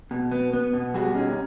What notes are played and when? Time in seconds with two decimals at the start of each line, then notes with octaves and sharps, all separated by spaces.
0.11 B2
0.31 B3
0.53 B3
0.73 B2
0.94 G3 F#4 G#4
1.15 B2 C#4 D#4